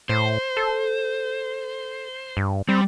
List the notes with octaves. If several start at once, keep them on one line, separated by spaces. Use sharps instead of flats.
A2 C5
A4
G2
G3 C4